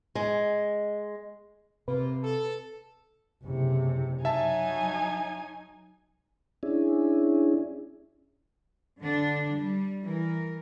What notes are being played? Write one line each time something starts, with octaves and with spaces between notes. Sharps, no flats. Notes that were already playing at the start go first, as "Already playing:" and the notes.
G#3
C3 A#3 F4 B4
A4
F#1 C3
F#3 D#4 E5 G#5 A5
C#4 D4 E4 G#4
D3 D4
G3
E3 A#4